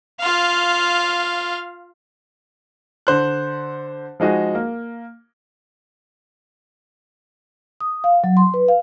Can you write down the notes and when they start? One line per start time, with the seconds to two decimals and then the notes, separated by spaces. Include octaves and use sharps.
0.20 F4 F5
3.07 D3 C5 F#6
4.20 F3 G#3 D#4 F#4 G#4
4.55 A#3
7.81 D#6
8.04 F5
8.24 F#3
8.37 C6
8.54 B4
8.68 F5